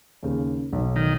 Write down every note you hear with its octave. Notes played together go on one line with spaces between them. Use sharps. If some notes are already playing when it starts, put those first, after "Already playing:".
D#2 C#3
B1
D#3